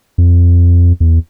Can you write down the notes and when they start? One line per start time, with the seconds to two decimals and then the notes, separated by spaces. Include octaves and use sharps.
0.18 F2
1.00 E2